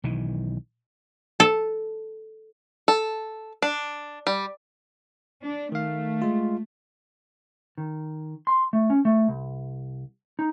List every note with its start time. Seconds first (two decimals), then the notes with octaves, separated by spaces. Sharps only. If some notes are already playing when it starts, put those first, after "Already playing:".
0.04 B1 D#3 E3
1.40 A4
2.88 A4
3.62 D4
4.27 G3
5.44 D4
5.72 D#3 A3 F5
6.22 G#3 F4
7.78 D#3
8.47 C6
8.73 A3
8.90 C#4
9.05 A3
9.28 C2
10.39 D#4